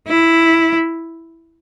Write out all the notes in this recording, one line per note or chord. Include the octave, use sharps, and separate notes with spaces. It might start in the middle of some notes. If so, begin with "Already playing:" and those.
E4